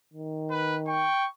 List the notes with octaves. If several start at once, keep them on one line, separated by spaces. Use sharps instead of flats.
D#3
B4
G5 C#6